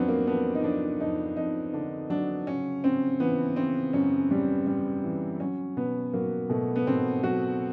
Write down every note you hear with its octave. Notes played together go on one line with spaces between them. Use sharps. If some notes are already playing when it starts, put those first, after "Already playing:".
Already playing: F2 F#3 B3 C4 D4
A#3
F2 B3
D#4
F2 D4
F2 D#4
F2 D#4
D3 D4
F#3 D4
C#3 C#4
C#3 C4
E3 B3
C#3 C4
F#2 C#4
G3
G3
E3
F#3 C#4
B2 B3
F#3 A#3
B2 A3
B3
B2 C4
F#3 F#4